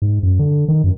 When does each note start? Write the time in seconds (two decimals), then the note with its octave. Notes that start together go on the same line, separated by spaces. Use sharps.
0.02 G#2
0.23 F#2
0.39 D3
0.68 D#3
0.84 F#2